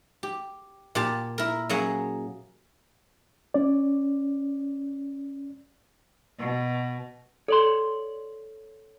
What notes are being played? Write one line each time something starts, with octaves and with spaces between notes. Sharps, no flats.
G4
A#2 G4 A5
E4 A#4
F#3 A#3 C#4 G#4 F#5
C#4 D5
B2
A4 C#5 D5 C6